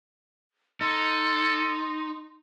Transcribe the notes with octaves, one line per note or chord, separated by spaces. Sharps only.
D#4 A4 C6